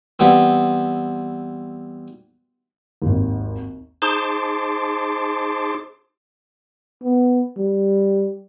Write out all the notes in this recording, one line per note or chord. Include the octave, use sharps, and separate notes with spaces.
E3 G3 B3 C4
G#1 D#2
D#4 G#4 C5 A5 C6 D6
B3
G3